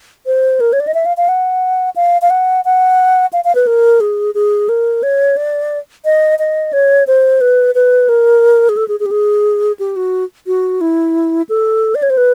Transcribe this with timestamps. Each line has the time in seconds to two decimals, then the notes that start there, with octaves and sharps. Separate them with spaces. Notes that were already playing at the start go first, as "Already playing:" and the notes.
0.26 C5
0.60 A#4
0.73 C#5
0.80 D5
0.87 D#5
0.94 E5
1.05 F5
1.17 F5
1.28 F#5
1.96 F5
2.22 F5
2.30 F#5
2.65 F#5
3.33 F5
3.44 F5
3.55 B4
3.67 A#4
4.00 G#4
4.35 G#4
4.69 A#4
5.03 C#5
5.37 D5
6.05 D#5
6.39 D#5
6.73 C#5
7.07 C5
7.41 B4
7.75 B4
8.09 A#4
8.69 G#4
8.77 A4
8.88 G#4
9.00 G#4
9.06 G4
9.11 G#4
9.79 G4
9.96 F#4
10.47 F#4
10.81 E4
11.49 A4
11.95 D5
12.02 C#5
12.10 C5
12.17 B4